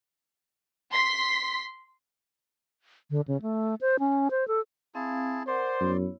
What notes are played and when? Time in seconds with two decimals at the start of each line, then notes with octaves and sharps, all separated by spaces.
0.93 C6 B6
3.11 D3
3.28 C#3
3.42 A3
3.81 C5
3.99 C#4
4.31 C5
4.48 A4
4.95 C4 E4 G#4 F5 A5
5.47 A#4 C5 D5 F#5 C6
5.80 F#2 B3 E4 C#5